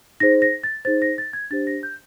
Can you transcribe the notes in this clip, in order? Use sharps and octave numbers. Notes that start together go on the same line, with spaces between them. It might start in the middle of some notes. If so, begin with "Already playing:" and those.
D#4 G#4 C5 A#6
A#6
A6
D#4 G#4 C5 A6
A#6
A6
G#6
D4 G4 C5 A6
A#6
G6